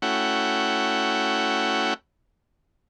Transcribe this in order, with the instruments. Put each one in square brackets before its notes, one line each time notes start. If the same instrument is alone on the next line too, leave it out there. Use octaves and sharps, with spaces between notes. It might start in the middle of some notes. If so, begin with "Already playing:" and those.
[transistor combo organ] A3 C#4 E4 F#4 F#5 G5